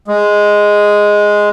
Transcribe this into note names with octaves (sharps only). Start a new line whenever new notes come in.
G#3